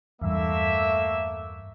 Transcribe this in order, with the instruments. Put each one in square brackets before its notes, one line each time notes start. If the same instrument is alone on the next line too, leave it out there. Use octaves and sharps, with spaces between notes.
[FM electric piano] E2 G2 [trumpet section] A3 A#3 E5